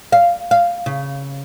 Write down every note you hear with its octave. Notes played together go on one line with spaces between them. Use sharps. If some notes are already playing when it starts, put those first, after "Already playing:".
F5
F5
C#3